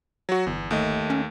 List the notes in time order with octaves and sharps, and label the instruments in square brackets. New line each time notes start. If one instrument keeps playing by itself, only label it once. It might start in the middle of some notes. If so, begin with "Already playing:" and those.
[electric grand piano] F#3 F#4
[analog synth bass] G1 [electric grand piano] E2
[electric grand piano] D#2 A3 D#5
[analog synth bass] C#4